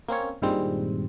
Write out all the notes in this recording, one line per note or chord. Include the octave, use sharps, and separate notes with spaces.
A#3 C4 C#4 C#5
G2 A#2 D#3 G3 G#3 C4